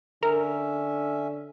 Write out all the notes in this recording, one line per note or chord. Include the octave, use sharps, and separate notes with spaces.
D3 C#4 A#4 E5